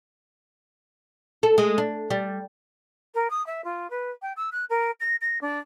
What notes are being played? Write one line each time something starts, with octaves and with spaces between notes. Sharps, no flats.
A4
G#3
D4
G3
A#4
D#6
E5
F4
B4
G5
E6
F#6
A#4
A#6
A#6
D4